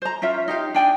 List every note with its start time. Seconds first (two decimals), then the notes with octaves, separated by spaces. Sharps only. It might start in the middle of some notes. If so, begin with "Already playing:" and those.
0.02 C5 A#5
0.22 C#4 F4 E5
0.48 D#4 G4 F5
0.74 D4 G5 G#5